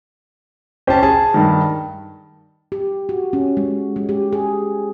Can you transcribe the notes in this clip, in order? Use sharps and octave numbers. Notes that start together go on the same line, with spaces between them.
C#4 G4 C5 A5
G#4 A5
G2 D#3
G4
F#4
C#4
G#3
G#3
G4
G#4